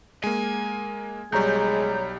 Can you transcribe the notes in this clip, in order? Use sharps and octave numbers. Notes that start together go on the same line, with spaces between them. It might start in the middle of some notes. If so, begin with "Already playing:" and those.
G#3 A#3 G#5
B1 G3 G#3 C#5 A#5 G6